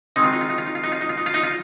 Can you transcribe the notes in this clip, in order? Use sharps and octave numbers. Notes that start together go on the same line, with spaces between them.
D#3 G#3 C4 D#4
F4
D#4
F4
D#4
F4
D#4
F4
D#4
F4
D#4
F4
D#4
F4
D#4
F4